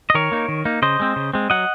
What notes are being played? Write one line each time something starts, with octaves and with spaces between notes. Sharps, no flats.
D#5
D#3 A#4 C#5
A#3 D#4
D#3
A#3 D#4
C#3 C5 D#5
G#3 C4
C#3
G#3 C4
F#3 D#5 F#5